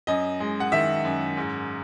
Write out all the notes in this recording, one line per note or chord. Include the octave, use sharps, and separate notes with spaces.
F#2 D#5
G#3
F#5
D#3 E5
F#2
G#2